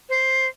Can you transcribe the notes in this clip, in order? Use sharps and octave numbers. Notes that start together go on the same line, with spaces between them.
C5